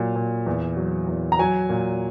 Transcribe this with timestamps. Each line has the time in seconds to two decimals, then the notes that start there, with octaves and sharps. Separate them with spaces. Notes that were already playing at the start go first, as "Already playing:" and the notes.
Already playing: A#2 F#3
0.15 A#2
0.46 E2
0.77 F#3
1.08 E2
1.32 A#5
1.39 F#3 G#5
1.69 A#2